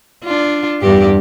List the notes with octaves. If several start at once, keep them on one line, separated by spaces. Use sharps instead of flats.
D4 F4
E2 G2 G4